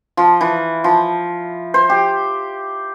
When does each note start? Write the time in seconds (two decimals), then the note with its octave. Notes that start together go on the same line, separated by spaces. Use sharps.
0.17 F3
0.41 E3
0.84 F3
1.74 C5
1.90 G4